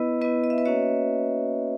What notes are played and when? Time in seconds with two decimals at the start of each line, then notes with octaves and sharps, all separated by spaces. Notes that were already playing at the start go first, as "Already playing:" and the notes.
Already playing: B3 E4 B4 D#5
0.21 B3 E4 B4 D#5
0.44 D#5
0.50 E5
0.58 B4 D#5
0.65 A#3 C#4 F#4 C#5 E5